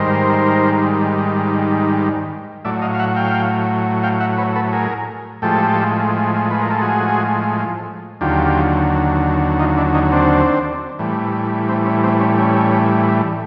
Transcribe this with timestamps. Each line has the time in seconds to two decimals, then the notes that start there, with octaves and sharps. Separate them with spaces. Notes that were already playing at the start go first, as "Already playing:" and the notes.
Already playing: G#2 D#3 G3 A#4 C5
2.65 A2 F#3 D5 E5
2.82 D#5 F5
2.94 F5
2.99 E5 F#5
3.16 F5 G5
4.04 F5 G5
4.20 E5 F#5
4.38 B4 C#5
4.55 A4 B4
4.73 G#4 A#4
5.42 A2 F3 G#3 G4 A4
6.51 B4
6.61 A#4
6.71 A4
6.81 F#4 G#4
8.21 D#2 D3 F#3 F4 G4
9.60 D#4 F4
9.77 D4 E4
9.94 C#4 D#4
10.12 C4 D4
10.99 A2 E3 G3
11.69 C4
11.86 C#4
12.04 C4
12.20 C#4
12.38 C#4